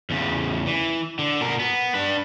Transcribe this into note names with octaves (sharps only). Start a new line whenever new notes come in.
E2 C#3
E3
D3
B2 A#4
B3
D4 B4